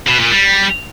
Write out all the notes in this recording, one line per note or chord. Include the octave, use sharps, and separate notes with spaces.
B2
A#2
G3